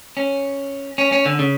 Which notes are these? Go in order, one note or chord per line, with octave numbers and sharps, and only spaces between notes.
C#4
C#4
C#4
D3
C#3